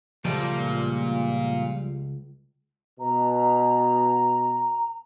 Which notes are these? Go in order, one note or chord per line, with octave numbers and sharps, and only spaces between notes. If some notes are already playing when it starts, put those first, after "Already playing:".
C#2 A#2 F3 G3 A3
B2 A#5